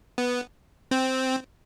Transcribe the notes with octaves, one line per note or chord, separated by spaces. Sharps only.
B3
C4